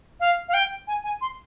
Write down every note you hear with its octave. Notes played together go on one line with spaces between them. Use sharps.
F5
F5
G5
G#5
G#5
C6